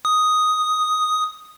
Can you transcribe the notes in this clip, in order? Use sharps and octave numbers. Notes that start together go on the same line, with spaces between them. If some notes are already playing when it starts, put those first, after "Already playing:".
D#6